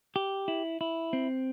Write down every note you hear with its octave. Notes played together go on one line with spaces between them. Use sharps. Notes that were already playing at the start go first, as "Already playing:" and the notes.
G4
E4
E4
C4